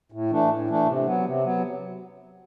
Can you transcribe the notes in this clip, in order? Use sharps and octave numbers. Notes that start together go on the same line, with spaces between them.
A2
E3 A3 D4
A2
E3 A3 D4
C3
F#3 B3
C3
F#3 B3